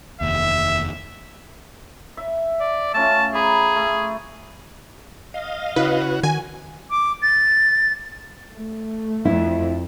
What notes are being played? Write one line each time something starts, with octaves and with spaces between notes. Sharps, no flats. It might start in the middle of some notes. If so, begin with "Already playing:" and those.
F1 D#2 E5
E5
D5
A3 C#4 F4 A5
G#4 A#5 B5 D6
A3
D#5 F5
C#3 E4 F#4 B4
D#3 F#4 G#5
D6
A6
A3
F2 E4